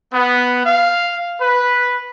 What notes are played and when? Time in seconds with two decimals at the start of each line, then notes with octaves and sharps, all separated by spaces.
0.14 B3
0.65 F5
1.41 B4